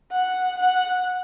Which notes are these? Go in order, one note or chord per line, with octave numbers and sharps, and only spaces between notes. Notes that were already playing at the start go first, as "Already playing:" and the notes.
F#5
F#5